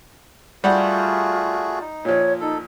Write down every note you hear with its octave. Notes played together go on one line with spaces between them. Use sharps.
G3 A3 F4 F#4 G#4 F#5
D#4
A#2 F3 C#5
D#4 A4